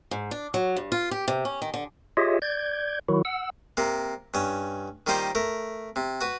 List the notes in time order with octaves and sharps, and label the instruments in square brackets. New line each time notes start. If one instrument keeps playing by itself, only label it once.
[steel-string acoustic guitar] G#2
D4
F#3
G2
F4
G4
C3
C#4
D#3
D3
[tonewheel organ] F4 G4 G#4 C#5 D#5 E5
D5 G6 G#6
D#3 F#3 E4 F#4
F#5 E6
[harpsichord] C3 A#3
G2 C#4
D#3 G3 A#3 D#4 F4 C5
A3 A#4
C3
F#4 B4